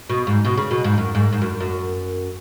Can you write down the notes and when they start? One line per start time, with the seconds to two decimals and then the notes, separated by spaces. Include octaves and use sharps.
0.09 B2
0.27 G#2
0.45 B2
0.57 C#3
0.71 B2
0.84 G#2
0.98 F#2
1.15 G#2
1.33 G#2
1.42 F#2
1.60 F#2